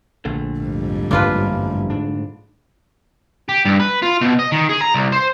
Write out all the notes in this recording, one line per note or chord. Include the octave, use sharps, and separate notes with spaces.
A#1 D3 A3
F2 G#2 G3
A1 G2 A#3 D4 F4 B4
G#2 D4
G4
G2
B4
F4
B2
D#5
D#3
G#4
A#5
C2
C5